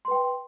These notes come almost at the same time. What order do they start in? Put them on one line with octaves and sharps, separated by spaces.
C6 B4 G5